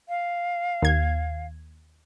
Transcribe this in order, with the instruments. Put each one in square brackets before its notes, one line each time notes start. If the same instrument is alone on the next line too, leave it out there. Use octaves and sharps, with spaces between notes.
[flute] F5
[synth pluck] D#2 G#6